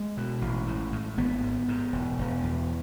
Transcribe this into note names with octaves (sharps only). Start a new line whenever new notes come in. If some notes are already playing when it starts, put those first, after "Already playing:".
Already playing: G#3
B2
A1
A2
A2
G#1 B3
G#2
G#2
E1
E1
E2